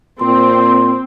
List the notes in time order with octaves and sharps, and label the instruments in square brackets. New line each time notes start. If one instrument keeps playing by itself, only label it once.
[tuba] A#2 [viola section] C4 [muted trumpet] C6